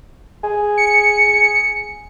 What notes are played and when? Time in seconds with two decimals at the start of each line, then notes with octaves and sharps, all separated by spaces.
0.44 G#4
0.78 C#7